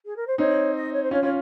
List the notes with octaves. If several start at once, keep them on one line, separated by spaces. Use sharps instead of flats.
G#4
A#4
C5
C4 D#4 C#5
D#5
C#5
C5
C#4 F4 C#5
C#4 F4 C#5